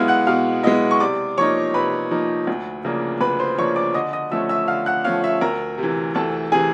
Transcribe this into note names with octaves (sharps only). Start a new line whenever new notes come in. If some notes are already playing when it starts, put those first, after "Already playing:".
Already playing: B2 G#3 B3 E4 F5 F6
F#5 F#6
B2 F5 F6
G#3 B3 E4 D#5 D#6
C#6
C3 D5 D6
F3 A#3 D#4 C#5 C#6
C3 B4 B5
F3 A#3 D#4
D2
C#3 F3 A#3 D4
D2 B4 B5
C5 C6
C#3 F3 A#3 D4 C#5 C#6
D5 D6
D3 D#5 D#6
D#5 D#6
F3 A3 C#4 E5 E6
E5 E6
D3 F5 F6
F#5 F#6
F3 A3 C#4 F5 F6
E5 E6
D2 A#4 A#5
C3 E3
D2 A4 A5
C3 E3 G#4 G#5